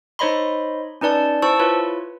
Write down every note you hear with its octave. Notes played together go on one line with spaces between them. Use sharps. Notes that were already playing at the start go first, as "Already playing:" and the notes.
D#4 C5 C#5 D#5 B5 C6
C#4 D#4 B4 D5 A5
E4 C5 A5 C#6 E6
E4 F4 B4 C#5